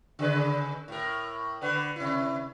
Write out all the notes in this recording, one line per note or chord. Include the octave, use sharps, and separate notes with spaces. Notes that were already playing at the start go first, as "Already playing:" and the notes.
C#3 G#4 B4
A2 A#4
D3 B4
C3 E4